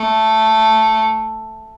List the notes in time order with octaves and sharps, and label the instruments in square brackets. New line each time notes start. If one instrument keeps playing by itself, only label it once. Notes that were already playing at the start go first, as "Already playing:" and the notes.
Already playing: [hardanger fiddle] A3